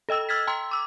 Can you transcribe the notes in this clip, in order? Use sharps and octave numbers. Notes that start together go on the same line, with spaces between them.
A4 D#5 G5 E6
E6 F6 G#6 A6 B6
G5 A#5 C6 E6
D6 E6